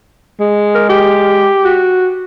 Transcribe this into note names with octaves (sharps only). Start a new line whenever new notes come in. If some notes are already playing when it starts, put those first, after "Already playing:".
G#3
A#4
G4
F#4